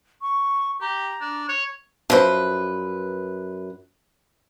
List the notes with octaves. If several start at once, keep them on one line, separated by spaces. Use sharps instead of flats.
C#6
G4 A#5
D4
C#5
F#2 F3 B4 C5